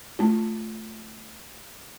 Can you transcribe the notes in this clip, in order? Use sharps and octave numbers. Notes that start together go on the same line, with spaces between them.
A3 F4